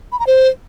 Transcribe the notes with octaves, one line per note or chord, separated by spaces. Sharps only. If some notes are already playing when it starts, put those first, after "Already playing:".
B5
A#5
C5